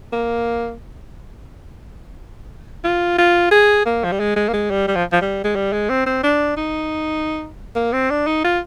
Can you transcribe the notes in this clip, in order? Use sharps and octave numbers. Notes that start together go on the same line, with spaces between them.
A#3
F4
F4
G#4
A#3
F3
G3
G#3
G#3
A#3
G#3
G3
G3
F3
F3
G3
G#3
G3
G#3
C4
C4
D4
D#4
A#3
C4
D4
D#4
F4